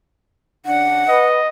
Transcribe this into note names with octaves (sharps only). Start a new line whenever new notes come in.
C#3 D4 F#5
B4 D#5